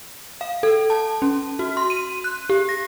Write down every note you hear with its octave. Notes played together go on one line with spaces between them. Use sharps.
F5
A4
A5
C#4
F#4
C6
D#7
F#6
G4
A#6